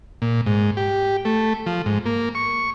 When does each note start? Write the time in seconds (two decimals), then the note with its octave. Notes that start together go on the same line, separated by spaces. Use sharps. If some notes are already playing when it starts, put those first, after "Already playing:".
0.22 A#2
0.46 G#2
0.77 G4
1.25 A3
1.66 F3
1.86 G#2
2.06 A#3
2.35 C#6